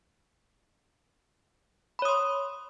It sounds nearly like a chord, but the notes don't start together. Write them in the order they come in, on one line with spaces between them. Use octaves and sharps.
B5 C#5 D#6 C6